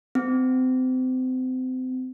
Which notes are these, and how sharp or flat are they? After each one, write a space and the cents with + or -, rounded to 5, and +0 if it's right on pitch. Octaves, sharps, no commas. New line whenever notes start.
C4 -30